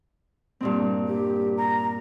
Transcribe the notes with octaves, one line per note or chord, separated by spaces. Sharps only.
G2 A#2 C4
G4
A#5